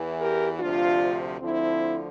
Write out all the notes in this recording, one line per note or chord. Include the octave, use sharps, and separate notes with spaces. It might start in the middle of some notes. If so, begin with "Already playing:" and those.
Already playing: E2 E3
G4 A#4
D2 C3 F3 D4 F4
D2 D3 F3 C4 E4